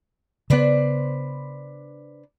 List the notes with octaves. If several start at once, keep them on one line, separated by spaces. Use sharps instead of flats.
C#3 B3 D4 B4 C5